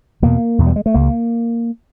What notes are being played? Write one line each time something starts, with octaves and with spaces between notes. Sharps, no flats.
E2 B2 A#3
E2 B2
G3
G#3
A3
C#2 C#3 A#3